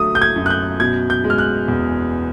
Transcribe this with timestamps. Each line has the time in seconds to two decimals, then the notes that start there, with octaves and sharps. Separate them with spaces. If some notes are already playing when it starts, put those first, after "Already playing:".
Already playing: D3 F#3 A3 D#6
0.15 G6
0.22 G#6
0.36 F#2
0.46 F#6
0.50 G6
0.80 B2 G#6
1.10 G6
1.24 G#3
1.30 F6
1.38 F#6
1.68 E2